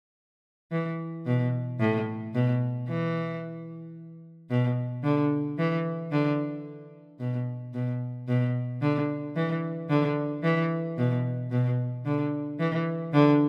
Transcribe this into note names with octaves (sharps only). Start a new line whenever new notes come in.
E3
B2
A2
B2
E3
B2
D3
E3
D3
B2
B2
B2
D3
E3
D3
E3
B2
B2
D3
E3
D3